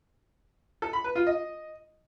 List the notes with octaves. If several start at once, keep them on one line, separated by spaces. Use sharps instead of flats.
A4
B5
B4
F4
D#5